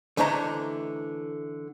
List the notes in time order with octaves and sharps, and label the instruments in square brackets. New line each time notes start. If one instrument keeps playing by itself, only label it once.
[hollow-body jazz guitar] D3 E3 A3 C5 D#5 A#5